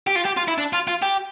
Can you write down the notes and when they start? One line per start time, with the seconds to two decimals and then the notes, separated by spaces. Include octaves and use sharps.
0.07 G4
0.16 F4
0.26 G4
0.37 F4
0.48 E4
0.58 D4
0.73 F4
0.87 F4
1.02 G4